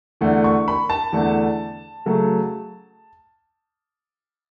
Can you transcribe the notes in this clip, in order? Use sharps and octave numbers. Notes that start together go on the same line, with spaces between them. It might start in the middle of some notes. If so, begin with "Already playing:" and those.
E2 D3 A3
C#6
B5
A5
E2 D3 A3
C#3 F#3 A3